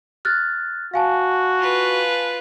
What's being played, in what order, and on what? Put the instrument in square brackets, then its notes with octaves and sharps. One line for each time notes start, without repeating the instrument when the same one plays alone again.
[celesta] F6 F#6 A6
[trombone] F#4 [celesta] F5 G#5 A5
[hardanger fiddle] F4 B4